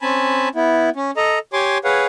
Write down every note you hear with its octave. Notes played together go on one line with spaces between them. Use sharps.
C4 C#4 G#5 A5 B5
B3 E4
C#4
A4 D#5 A#5
G4 C#5 G#5 C6 D6
G#4 B4 C#5 F5 F#5